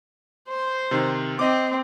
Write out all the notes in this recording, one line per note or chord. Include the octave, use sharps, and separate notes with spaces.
C5
C3 D#3
C4 D#5 D6